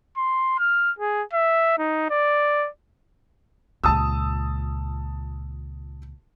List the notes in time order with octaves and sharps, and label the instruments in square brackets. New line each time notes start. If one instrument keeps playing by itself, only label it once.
[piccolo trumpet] C6
F6
G#4
E5
D#4
D5
[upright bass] C#2 A#2 [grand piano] A5 D#6 E6